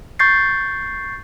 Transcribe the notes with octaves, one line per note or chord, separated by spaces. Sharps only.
C#6 G6 A6 C7